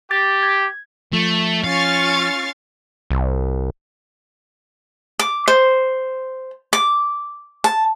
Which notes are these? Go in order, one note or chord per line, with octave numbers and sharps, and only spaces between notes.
G4 A6
G#6
F3 A3
C#4 F4 F5 C#6 F6 A6
C2
D6
C5
D6
A5